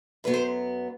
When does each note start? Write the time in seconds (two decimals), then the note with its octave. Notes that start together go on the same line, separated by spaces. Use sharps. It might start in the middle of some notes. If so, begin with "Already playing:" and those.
0.24 F#2 F#3 B3 B4
0.34 C5